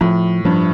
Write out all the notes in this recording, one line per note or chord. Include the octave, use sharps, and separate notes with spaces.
A2 F3
G2 F3